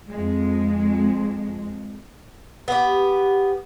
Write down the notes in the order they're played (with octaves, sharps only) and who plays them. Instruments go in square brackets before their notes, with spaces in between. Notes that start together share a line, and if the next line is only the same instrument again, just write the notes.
[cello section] F2 G#3
[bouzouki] B3 G4